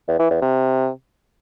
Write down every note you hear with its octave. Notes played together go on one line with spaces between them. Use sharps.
E2
E3
E2
C3